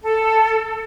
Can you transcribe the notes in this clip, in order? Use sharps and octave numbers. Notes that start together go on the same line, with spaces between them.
A4